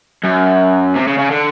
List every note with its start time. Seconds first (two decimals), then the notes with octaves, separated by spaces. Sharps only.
0.24 F#2
0.95 C3
1.07 C#3
1.18 C#3
1.31 D3